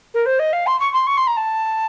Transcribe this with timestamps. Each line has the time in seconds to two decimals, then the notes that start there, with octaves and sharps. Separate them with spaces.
0.14 A#4
0.25 C5
0.39 D#5
0.53 F5
0.66 C6
0.80 C#6
0.93 C6
1.07 C#6
1.17 C6
1.27 A#5
1.37 A5